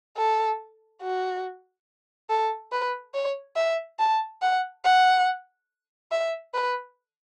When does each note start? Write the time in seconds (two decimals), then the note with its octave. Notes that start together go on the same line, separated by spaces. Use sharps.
0.18 A4
1.02 F#4
2.29 A4
2.72 B4
3.14 C#5
3.56 E5
3.99 A5
4.42 F#5
4.85 F#5
6.12 E5
6.54 B4